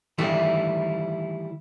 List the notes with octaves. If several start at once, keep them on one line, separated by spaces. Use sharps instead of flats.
D#3 E3 G3 A3 E4